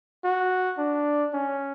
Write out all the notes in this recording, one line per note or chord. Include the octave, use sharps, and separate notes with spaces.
F#4
D4
C#4